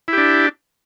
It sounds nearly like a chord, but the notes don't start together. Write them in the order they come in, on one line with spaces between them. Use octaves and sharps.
E4 G4 D4